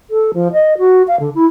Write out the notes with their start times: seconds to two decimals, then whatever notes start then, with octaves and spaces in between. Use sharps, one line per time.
0.10 A4
0.34 F3
0.52 D#5
0.78 F#4
1.07 F5
1.19 D3
1.34 E4